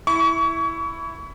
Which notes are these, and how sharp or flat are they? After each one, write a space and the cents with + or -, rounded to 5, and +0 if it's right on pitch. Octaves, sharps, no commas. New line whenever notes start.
E4 +0 C#6 +35